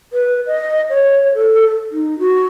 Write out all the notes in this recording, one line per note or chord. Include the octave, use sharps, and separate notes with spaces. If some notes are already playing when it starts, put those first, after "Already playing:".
B4
D#5
C#5
A4
D#4
F#4